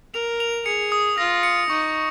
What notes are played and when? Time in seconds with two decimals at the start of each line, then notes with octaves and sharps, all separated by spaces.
0.14 A#4 F7
0.40 F7
0.66 G#4 C#7
0.92 D#6
1.18 F4 A#6
1.43 C#7
1.69 D#4 C#6